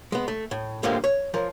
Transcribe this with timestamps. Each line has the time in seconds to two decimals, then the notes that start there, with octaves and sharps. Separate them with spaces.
0.12 G#3 B3
0.28 A3
0.51 A2
0.83 A2 D3 F3 G3 G#3 A#3
1.04 C#5
1.34 F3 A#4 C#5